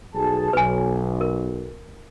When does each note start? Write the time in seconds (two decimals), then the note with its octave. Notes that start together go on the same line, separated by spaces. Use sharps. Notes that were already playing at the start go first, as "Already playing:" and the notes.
0.15 B1 G#4 A5
0.53 B1 B4 G#5
1.21 A#4